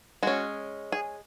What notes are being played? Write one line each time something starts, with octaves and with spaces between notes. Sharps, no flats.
G#3 C#4 F#4
G#4